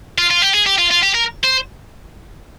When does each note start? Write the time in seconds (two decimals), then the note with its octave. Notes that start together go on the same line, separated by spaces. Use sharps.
0.18 F4
0.30 F4
0.42 G4
0.54 G#4
0.66 G4
0.78 F4
0.91 F4
1.03 G4
1.14 A#4
1.43 C5